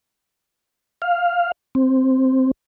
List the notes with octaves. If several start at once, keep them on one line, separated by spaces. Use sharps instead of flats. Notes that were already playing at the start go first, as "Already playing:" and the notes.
F5
C4